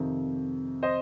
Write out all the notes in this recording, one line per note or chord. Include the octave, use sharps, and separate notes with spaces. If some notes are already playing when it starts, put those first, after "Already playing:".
Already playing: F2 C3 D#3
C5 D#5